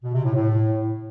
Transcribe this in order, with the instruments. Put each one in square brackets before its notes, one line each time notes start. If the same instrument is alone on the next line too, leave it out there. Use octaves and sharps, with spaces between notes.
[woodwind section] B2
C3
A2
A2